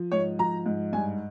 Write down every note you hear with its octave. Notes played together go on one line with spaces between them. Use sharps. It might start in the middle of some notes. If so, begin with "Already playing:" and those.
Already playing: F3
G#2 C#5
F3 A#5
G#2
G2 G#5